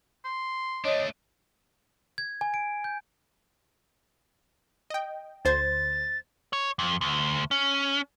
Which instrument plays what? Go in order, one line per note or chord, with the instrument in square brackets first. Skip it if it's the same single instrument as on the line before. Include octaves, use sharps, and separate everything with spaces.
[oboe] C6
[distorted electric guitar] A3 D4 [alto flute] C#5 [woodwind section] D#5
[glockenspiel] G#6
G#5
D7
G6
[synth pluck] D#5 G5
[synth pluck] D2 C5 G#6 [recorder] A6
[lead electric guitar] C#5
F2
D2
C#4